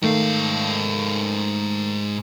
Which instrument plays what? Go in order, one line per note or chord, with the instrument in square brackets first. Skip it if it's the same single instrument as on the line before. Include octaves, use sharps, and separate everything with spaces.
[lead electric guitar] G#2 F5 [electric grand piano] D#3 A3